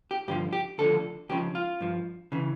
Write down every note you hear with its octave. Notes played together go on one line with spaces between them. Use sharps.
G4
G2 D3 F3 G4
G4
D2 D3 F3 A4
C#2 C#3 F3 G4
F4
G2 F3
C#3 E3